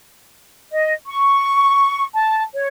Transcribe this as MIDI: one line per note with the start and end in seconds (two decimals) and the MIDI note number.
0.71 0.93 75
1.07 2.05 85
2.14 2.43 81
2.54 2.67 73